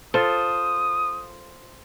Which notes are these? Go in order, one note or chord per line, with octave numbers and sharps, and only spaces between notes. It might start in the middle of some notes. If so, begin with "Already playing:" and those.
F4 A4 C5 D#6